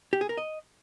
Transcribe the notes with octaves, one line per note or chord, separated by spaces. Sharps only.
G4
G#4
A#4
D#5